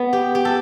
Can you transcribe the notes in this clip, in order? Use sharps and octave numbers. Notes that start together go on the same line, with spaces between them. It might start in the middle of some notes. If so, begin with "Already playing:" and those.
Already playing: B3
G4
G4
A4